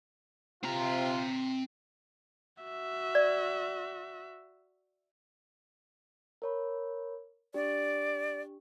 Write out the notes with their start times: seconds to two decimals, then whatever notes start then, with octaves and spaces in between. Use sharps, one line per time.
0.63 C3 C4 F4 A#5
2.62 F#4 E5
3.15 D5
6.42 A#4 C#5 B5
7.54 D4 G4 D5